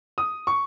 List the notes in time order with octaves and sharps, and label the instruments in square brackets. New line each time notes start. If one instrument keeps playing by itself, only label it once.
[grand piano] D#6
C#6